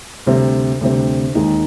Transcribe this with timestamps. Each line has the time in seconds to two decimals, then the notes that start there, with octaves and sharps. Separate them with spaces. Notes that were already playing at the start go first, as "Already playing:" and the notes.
0.26 D2 C3 G3 C4
0.81 D2 C3 G3 C4
1.35 D#2 D#3 G#3 D#4